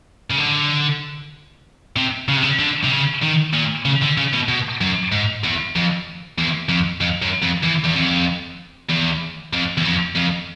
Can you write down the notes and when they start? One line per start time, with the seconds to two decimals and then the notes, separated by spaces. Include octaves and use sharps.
0.31 C#3
0.39 D3
1.96 C3
2.28 C#3
2.37 C3
2.43 C#3
2.59 D3
2.84 C3
2.92 C#3
3.23 D#3
3.54 A#2
3.85 C#3
4.02 D3
4.17 C#3
4.33 B2
4.48 B2
4.81 F#2
5.12 G#2
5.43 E2
5.75 F2
6.38 E2
6.69 F2
7.01 F2
7.22 F#2
7.43 F2
7.63 E2
7.85 E2
7.96 F2
8.90 E2
9.53 F2
9.78 E2
9.84 F2
10.16 F2